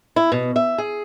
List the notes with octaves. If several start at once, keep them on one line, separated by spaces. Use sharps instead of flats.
E4
B2
E5
G#4